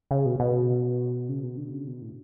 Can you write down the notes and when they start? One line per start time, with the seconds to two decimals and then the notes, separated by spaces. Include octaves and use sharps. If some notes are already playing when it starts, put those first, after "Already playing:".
0.11 C#3
0.26 B2
0.40 B2
1.29 C#3
1.43 B2
1.57 D3
1.72 C#3
1.87 B2
2.02 A2